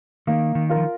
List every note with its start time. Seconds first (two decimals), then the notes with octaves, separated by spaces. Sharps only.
0.27 D#3 A#3
0.55 D#3
0.69 F4 A#4
0.76 F3